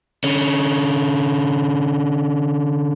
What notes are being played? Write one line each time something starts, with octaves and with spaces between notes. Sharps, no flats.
D3 C#4